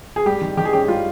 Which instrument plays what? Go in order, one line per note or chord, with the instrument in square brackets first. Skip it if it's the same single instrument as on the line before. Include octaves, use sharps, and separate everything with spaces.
[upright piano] G#4
G3 G4
D#3
D#3 G4
G#4
C#4 G4
G3 F4